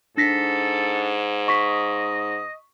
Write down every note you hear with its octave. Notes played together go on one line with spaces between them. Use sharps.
G#2 D4 A4 A#6 B6
D#5 C#6 B6